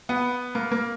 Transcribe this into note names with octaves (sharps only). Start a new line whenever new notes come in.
B3
A#3
A#3